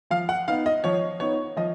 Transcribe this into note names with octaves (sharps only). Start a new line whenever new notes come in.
F3 F5
F#5
B3 D#4 F5
D#5
F3 C#5
B3 D#4 C#5
F3 D#5